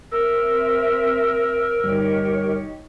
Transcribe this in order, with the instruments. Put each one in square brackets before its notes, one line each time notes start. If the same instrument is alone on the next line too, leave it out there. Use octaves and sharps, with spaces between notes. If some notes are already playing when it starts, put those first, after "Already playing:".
[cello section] C4 E5 [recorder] A#4 [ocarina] E6
[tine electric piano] G1 G3 [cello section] D#4 G4 C#5